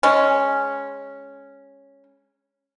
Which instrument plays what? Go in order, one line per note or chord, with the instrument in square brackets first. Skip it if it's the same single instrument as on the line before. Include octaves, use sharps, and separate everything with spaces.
[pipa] G#3 C#4